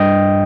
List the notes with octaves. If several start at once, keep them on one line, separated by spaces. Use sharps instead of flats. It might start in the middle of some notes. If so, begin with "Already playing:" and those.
Already playing: G2 D#5 G5